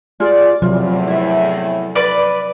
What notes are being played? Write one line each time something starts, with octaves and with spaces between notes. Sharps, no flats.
F4 G#4 D5
E2 A2 C3 F3 F#3 F4
E4 E5
B4 D5